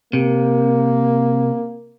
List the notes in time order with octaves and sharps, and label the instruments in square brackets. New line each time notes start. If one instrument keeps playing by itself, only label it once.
[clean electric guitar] C3 [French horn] A#3